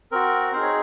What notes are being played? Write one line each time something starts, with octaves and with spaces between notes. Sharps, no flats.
C4 F#4 A#4
C4 D#4 G#4 C5
C#5